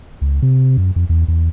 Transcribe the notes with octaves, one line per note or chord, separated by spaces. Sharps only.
C#2
C3
F#2
F2
E2
E2